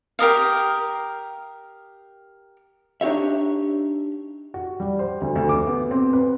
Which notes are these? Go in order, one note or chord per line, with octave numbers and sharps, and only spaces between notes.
G4 A#4 D#5 F5
D4 D#4 G4 C#5 E5
F#4
G3
C5
D2
D2
D6
B3
C4
B4